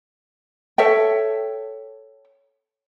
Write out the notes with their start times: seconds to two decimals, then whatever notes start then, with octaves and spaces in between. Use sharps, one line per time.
0.78 A4 C#5 E5 G5